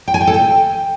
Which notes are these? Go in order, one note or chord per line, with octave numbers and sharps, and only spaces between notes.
G5
G#5
G5
A4
G5